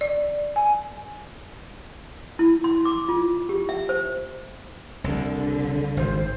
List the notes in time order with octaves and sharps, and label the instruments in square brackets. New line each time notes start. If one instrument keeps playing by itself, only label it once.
[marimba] D5
G#5
[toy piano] E4
C6
D6
F4
G4
E5
C5
[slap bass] C2 [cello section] D3
[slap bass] G#1 [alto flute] C5